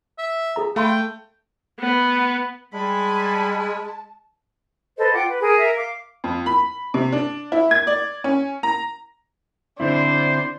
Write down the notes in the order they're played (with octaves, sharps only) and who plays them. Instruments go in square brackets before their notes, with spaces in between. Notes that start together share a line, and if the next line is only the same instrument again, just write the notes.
[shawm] E5
[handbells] G#4 A4 A#5
[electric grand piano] A3 [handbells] F5 B5 C6 [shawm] G5
[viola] B3
[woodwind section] G3 [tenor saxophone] G#3 [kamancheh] G#5 B5 [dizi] A5
[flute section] A4 B4 C5 D#5
F4 F#5 G5 D6
B4
G#4 A#4
A#4 E5 A#5
F5 D6
[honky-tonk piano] F2
B5
C3
D4
E4
G#6
D5
C#4
A#5
[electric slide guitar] D3 C4 E4 [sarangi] D4 [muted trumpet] C5